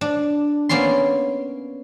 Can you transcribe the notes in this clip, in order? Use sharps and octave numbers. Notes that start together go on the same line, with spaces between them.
D4
A#3 B3 C#4 D5 C6